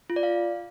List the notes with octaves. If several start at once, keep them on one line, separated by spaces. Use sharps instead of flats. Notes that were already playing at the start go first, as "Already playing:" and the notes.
F4
D5
F5